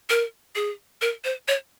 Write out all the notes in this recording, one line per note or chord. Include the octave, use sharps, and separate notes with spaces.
A#4
G#4
A#4
C5
C#5